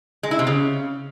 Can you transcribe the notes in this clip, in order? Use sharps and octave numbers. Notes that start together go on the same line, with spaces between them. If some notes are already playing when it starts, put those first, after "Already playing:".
G#3
E4
C3
C#3